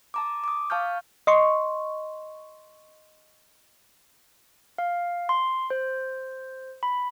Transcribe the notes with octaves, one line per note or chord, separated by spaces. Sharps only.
A5 A#5 D6
D6 D#6
F5 A5 C#6 F6 G6
D#5 C6 C#6
F5
C6
C5
B5